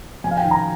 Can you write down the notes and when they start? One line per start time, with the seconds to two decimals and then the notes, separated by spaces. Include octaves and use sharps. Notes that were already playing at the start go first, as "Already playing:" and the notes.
0.24 F2 G#5
0.31 F5
0.37 G5
0.44 D#3
0.51 A#5